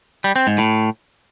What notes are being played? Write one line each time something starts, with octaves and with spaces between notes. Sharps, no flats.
G3
C4
G#2
A2